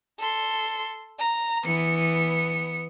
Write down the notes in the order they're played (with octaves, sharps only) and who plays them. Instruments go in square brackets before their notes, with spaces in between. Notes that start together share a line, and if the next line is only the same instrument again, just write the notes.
[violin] A4 C6
A#5
[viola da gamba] E3 [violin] B3 C#7